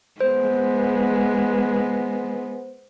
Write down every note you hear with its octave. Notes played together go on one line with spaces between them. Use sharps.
G#3 B3 C5